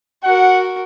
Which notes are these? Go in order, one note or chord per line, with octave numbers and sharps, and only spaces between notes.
F#4 A#4 F#5